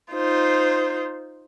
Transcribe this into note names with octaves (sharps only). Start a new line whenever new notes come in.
D#4 F4 C5